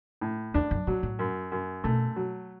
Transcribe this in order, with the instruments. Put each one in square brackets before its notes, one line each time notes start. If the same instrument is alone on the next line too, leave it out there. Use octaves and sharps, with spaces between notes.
[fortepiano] A2
[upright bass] E2 [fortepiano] D4
[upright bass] F#2
[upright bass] A2 [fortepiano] F#3
[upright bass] A2
[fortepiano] F#2
F#2
[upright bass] B2 [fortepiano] A3
[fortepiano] F#3